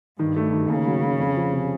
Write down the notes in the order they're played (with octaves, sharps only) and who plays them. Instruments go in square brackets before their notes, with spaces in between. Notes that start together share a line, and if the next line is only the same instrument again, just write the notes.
[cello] G2 [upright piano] D#3
[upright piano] A3
D#3
[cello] C#3 [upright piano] A#3
[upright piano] F#3
F#3
F2
F3
C3